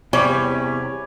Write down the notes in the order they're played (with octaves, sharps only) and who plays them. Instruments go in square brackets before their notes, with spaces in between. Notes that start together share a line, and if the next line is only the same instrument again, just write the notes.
[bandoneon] E2 C#4 [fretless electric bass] C3 [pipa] G3 [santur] C#5 B5 D6